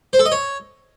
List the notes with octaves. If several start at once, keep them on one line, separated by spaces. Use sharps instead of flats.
C5
A4
D#5
C#5